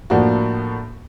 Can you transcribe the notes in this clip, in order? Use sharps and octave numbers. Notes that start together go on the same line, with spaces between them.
A2 F3 A#3 D4 F#4